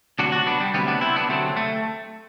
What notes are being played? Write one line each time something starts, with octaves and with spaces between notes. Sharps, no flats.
D2 C3 F#3 D4 F#4
D4 F#4
B3 D4
G3
D2 C3 F#3 G3 B3
B3 D4
C4 E4
B3 D4
D2 C3 F#3 A3 C4
A3